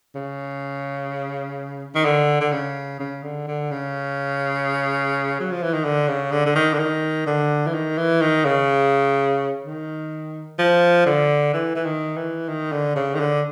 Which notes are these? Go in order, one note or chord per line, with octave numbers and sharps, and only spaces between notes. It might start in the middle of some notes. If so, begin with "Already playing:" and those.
C#3
D#3
D3
D3
C#3
C#3
D3
D3
C#3
F#3
F3
E3
D#3
D3
C#3
D3
D3
D#3
D3
D#3
D3
E3
D#3
E3
D#3
C#3
D#3
F3
D3
E3
E3
D#3
E3
D#3
D3
C#3
D#3
D3